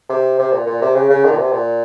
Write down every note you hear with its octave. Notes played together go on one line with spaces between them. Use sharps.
C3
C3
A#2
A#2
C3
C#3
C#3
D#3
A#2
C3
A#2